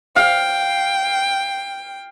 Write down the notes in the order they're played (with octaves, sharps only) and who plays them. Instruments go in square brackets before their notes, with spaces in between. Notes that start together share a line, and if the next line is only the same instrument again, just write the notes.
[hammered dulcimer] F5 [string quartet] G5